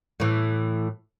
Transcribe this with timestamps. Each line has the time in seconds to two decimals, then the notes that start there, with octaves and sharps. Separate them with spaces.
0.20 A2 E3